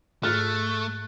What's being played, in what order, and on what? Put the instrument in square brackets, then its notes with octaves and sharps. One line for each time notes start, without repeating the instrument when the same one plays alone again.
[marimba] G#2 [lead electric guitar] A3 [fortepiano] F6 [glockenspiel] F#6 A6